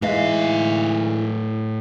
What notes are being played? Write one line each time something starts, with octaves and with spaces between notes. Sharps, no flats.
A2 E3 G#3 D#4 F5